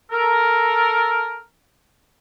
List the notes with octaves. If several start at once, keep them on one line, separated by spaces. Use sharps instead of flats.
A4 A#4